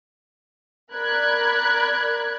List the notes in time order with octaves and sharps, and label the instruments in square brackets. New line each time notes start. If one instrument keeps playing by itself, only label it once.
[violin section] A#4 D5 B5 F#6 G#6